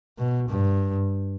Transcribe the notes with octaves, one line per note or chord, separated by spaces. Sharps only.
B2
G2